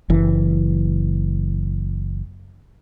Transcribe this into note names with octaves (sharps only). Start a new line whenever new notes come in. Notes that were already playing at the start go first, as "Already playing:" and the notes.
F#1 E3